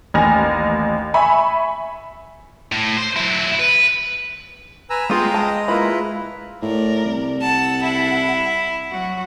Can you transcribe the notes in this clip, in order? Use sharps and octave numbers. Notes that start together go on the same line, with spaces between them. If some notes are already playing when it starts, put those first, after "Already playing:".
A1 D#2 G#5 F6 A#6 F7
E5 G#5 B5 C#6
A2
C5
F#3 E4
B4
B4 G#5 A#5 E6
G#3 B3 F4 F5 G5 D#6
A5
A#3 E4 F4 B4 B5
A2 A#4 D5
C2
A4 F#5 A5
E4
F#3 F#4 F#5